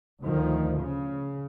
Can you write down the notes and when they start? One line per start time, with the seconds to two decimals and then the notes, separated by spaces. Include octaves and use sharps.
0.24 D2 D#3 F3
0.81 C#3